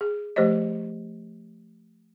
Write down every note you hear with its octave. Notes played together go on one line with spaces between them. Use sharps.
G#4
F3 A3 G4 C5 C#5 D#5